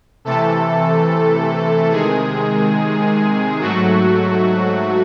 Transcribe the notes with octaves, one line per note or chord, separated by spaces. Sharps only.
C3 E3 A3 A4
C3 D#3 G#3 G#4
G#2 F#3 A3 F#4